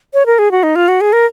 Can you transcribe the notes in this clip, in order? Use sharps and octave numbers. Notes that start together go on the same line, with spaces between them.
C#5
A#4
G#4
F#4
D#4
F4
F#4
G#4
A#4